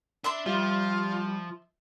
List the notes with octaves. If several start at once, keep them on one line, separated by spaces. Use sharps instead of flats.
D4 E5 B5 C6
F3 G3 F4